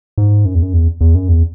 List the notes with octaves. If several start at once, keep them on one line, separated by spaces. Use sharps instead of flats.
G#2
F#2
E2
F#2
E2
E2
F#2
E2